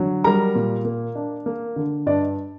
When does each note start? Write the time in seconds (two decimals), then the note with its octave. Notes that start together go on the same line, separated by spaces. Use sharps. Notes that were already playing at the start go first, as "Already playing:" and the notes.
Already playing: D3 F#3
0.24 G3 A#4 A#5
0.55 A#2
0.85 A#3
1.15 D4
1.46 A#3
1.76 D3
2.06 G2 D4 D5